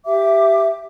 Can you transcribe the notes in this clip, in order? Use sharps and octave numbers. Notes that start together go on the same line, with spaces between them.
G4 E5 D6